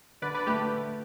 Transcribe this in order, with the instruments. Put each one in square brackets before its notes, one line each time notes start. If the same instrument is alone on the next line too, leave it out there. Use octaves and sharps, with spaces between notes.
[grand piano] D3 [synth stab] B4 D5
[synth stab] B4 D5
[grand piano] A3 [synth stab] G4 B4